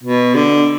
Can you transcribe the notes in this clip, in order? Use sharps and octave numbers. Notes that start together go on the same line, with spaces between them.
B2
D3